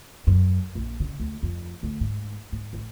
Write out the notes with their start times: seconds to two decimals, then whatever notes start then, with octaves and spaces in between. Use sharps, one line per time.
0.27 F#2
0.75 A#1
1.00 C#3
1.20 D2
1.43 F2
1.83 D2
2.01 G#2
2.52 G#2
2.73 A1